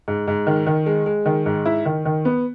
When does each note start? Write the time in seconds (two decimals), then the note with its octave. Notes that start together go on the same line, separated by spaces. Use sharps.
0.08 G#2
0.28 G#2
0.47 D#3
0.67 D#3
0.86 G#3
1.06 G#3
1.26 D#3
1.46 G#2
1.65 E4
1.85 D#3
2.05 D#3
2.25 B3